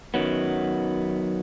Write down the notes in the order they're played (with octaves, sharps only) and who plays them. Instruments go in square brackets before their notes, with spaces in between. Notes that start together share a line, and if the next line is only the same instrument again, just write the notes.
[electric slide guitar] F#2 D#3 F#3 B3